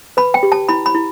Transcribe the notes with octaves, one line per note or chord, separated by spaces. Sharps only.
B4 B5
G5
G4
A5
E4 B5
B5
E4